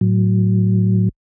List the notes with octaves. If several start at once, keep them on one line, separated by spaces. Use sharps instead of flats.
A2 F#3